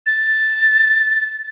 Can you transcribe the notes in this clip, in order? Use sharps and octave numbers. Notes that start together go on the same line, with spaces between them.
A6